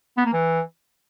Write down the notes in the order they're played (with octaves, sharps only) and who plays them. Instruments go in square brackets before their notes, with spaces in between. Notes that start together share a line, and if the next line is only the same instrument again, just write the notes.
[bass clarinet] B3
A#3
E3